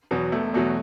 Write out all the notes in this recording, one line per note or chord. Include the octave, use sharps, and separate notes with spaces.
E2 B2 F#3 B3
E1 A3
E2 B2 F#3 A3